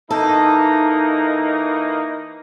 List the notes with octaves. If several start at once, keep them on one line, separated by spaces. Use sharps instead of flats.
E3 A#3 D#4 A4